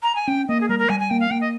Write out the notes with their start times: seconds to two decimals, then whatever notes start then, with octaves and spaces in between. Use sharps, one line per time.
0.03 A#5
0.16 G#5
0.27 C#4 G5
0.49 A#3 D#5
0.61 G#4
0.69 G3 A#4
0.79 A#4
0.89 G3 G#5
1.00 G#5
1.10 A#3 G5
1.20 F5
1.31 A#3 G5
1.41 D#5